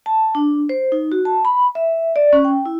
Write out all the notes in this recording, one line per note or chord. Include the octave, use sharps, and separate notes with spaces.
A5
D4
C5
D#4
F#4
A5
B5
E5
D5
C#4
G5
E4